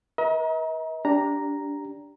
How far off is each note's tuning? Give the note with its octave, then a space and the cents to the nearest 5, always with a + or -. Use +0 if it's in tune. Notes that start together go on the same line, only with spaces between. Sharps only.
B4 -45 D#5 +45 A#5 +25
D4 -20 G4 +0 A#5 +0